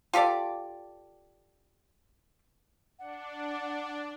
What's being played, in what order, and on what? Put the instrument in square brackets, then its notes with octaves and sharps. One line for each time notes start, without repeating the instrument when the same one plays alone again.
[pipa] F4 G4 A4 D5
[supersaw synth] D4 [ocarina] F#5